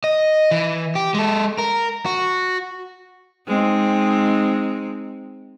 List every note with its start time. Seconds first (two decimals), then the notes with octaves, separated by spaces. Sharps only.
0.04 D#5
0.51 E3
0.95 G4
1.14 G#3 A4
1.58 A#4
2.06 F#4
3.48 G#3 C4 D#4